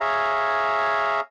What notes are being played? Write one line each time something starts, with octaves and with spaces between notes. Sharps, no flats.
G#4 C#5 E5 F5 A#5